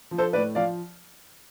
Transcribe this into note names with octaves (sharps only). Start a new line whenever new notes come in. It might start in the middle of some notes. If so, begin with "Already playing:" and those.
F3
A4 C5
A2 B4 D5
F3 D5 F5